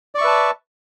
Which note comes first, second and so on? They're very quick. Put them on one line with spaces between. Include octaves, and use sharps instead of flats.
D5 C#6 E5 B4 A5